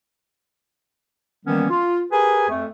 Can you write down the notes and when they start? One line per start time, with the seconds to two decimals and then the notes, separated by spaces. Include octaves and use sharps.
1.46 D#3 E3 G3 A#3 B3 C#4
1.70 F4
2.11 G4 G#4 A#4 B4 G#5
2.50 F2 A3